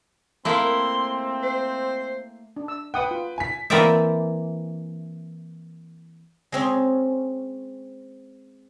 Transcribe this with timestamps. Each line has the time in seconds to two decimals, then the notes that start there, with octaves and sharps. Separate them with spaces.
0.45 A3 A#3 C4 E4 C6
1.43 C5
2.56 D4
2.68 E6
2.94 B4 F#5 G5 D#6
3.11 F4
3.38 G#5 B6
3.70 E3 A#3 C4 A#4 D5 E5
6.52 G#3 C4 C#4